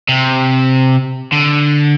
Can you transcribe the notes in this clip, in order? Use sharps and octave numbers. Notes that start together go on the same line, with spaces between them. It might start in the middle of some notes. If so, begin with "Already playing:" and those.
C3
D3